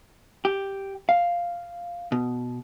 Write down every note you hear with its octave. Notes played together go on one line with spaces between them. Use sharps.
G4
F5
B2